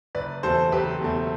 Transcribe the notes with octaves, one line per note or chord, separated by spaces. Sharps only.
F#1 B4 D5
E2 B2 A3 A4 C5
F#1 G4 B4
E2 B2 A3